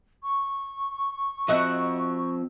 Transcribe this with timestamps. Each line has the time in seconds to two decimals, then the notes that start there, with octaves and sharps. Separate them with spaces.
0.23 C#6
1.48 F3 C4 F#4 D#5 E5